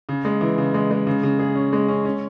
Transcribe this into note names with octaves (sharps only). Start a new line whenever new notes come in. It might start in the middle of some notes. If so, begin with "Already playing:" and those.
C#3
G#3
E3
C#3
G#3
G#3
C#3
C#3
G#4
C#4
G#3
C#4
C#4